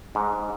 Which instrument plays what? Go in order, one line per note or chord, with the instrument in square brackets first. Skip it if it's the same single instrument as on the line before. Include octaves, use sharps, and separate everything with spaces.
[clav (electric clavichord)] G#2